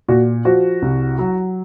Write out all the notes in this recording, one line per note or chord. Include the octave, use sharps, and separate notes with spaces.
A#2 F#4
F3 F#4
C2
F#3